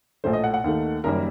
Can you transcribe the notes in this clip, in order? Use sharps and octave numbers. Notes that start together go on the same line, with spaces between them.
A#1 A2 A3 C5
D#5
F#5
F#5
D#2 D#3 A3
F#1 F#2 D#3 G3 A#3 A#4